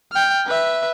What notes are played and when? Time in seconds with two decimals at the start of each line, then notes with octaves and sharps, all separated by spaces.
0.12 G5 F6
0.46 B4 E5